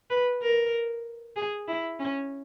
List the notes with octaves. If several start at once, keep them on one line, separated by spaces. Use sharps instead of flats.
B4
A#4
G#4
E4
C#4